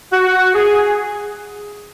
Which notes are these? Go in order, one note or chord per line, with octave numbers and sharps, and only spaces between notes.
F#4
G#4